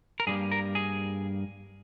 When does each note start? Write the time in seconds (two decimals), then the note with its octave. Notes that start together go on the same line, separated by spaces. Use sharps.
0.20 A#4
0.27 G2 G3 A#3 G#4
0.52 A#4
0.75 G#4